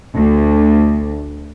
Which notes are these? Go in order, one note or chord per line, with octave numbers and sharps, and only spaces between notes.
D2